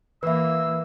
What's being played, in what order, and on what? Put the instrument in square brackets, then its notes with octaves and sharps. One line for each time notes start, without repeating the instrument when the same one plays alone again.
[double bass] E3 A#3 [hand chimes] B4 E5 [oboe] E6